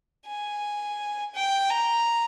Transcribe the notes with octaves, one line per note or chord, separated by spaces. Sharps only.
G#5
G5
A#5